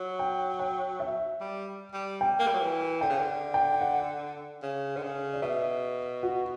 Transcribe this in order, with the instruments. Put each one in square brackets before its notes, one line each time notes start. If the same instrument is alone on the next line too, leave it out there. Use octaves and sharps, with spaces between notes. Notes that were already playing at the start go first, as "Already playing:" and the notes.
Already playing: [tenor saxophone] F#3
[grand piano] G5
G5
E5
[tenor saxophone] G3
G3
[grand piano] G5
[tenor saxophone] A#3
G3
F#3
E3
[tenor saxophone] D3 [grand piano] G5
[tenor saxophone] C#3
D3
[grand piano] G5
F#5
[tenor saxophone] C#3
D3
C#3
[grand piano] D5
[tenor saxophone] B2 [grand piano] E5
[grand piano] F#4